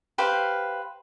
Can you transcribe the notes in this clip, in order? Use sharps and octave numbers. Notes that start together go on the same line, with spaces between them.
G4 B4 C5 F5